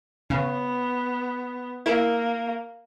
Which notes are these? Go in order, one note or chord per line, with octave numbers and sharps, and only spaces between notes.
C#3 B3
A#3 E4 A#4